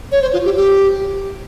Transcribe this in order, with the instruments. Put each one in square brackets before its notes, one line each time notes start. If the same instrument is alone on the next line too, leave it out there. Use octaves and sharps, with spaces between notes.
[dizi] C#5
C5
F4
G4
G4